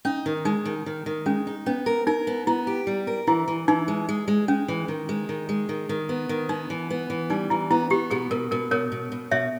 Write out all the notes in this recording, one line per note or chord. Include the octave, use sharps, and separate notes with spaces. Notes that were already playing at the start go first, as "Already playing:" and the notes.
C#4 D#4
D#3
G#3 D#4
D#3
D#3
D#3
G#3 C#4
D#4
B3 C#4
A#4
D#4 A#4
B3
B3 E4
G4
G3
A#4
E3 E4
E3
E3 D#4
G#3
G#3
G#3
G#3 C#4
E3
D#3
G#3
D#3
G#3
D#3
D#3
B3
D#3
B3 D#4
E3
B3
E3
G3 D#4
E3 E4
B3 E4
B3 G4
B2 G#4
B2 A#4
B2 A#4
B2 A#4 C#5
B2
B2
B2 C#5 E5